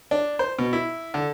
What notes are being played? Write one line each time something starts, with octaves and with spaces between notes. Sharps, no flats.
D4
C5
B2
E4
D3